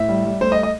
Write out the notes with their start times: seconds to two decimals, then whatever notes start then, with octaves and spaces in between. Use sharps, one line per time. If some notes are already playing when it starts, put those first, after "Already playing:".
Already playing: A2 E5
0.09 G3
0.25 G3
0.41 A3 C5
0.52 D#5
0.63 D#5